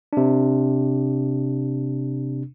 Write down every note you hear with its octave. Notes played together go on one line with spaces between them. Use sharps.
C3 D4